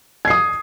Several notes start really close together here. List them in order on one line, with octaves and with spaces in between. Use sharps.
G#6 C7 D#6